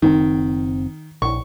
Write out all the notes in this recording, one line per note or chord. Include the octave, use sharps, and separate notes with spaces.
F#1 A2 D#3 C4
A#1 C#6